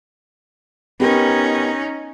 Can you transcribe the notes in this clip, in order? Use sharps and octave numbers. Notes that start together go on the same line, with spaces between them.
B3 C#4 D#4 G4 A#4